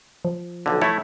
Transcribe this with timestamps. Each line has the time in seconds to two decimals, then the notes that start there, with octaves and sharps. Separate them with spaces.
0.25 F3
0.66 B1 D3
0.81 A3 E4 C#5